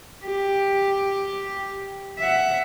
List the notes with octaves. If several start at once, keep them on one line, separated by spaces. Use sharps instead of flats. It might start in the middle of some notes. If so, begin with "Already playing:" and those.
G4
E5 F#5